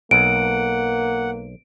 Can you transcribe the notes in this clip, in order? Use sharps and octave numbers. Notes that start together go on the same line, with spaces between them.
B1 A#3 F#5 D7